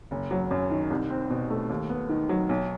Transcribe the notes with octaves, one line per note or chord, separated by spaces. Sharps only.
F#1
F#3
F#2
D#3
C2
C4
B2
A3
D#2
B3
D#3
F#3
B1